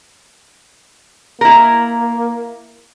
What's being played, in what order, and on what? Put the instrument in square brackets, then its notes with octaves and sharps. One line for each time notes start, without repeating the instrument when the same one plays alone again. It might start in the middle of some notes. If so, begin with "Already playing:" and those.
[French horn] A#3 [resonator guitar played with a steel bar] E4 A#4